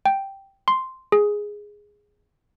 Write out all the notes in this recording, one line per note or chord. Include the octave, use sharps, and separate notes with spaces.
G5
C6
G#4